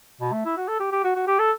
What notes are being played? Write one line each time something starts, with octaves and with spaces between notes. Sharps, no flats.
B2
A3
E4
F#4
A4
G4
G4
F#4
F#4
G4
A4